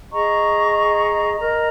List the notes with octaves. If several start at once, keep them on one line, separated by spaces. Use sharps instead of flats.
G#4 D#5 A#5 C#6
A#4 D#5 A#5